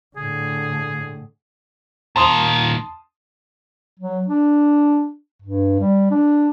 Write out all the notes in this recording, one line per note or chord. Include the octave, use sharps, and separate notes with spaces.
A2 D3 G#4
A#2 D#3 A5 C6 D#6
F#3
D4
G2
G3
D4